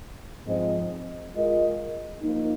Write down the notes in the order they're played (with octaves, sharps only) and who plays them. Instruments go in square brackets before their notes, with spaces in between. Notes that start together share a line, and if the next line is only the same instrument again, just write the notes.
[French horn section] G#2 F3 C4 G#4 D#5
G#3 F4 A#4 D#5
F3 A#3 D#4